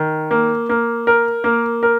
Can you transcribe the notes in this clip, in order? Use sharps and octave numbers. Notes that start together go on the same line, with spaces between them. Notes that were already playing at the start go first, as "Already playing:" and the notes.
Already playing: D#3
A#3
A#3
A#4
A#3
A#4